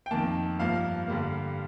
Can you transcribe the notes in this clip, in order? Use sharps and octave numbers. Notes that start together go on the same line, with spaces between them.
G5
F2 D#3 A#3 A5
G2 F3 A#3 F5
G2 D3 G3 A#3